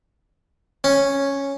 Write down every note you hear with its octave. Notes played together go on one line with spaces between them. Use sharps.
C#4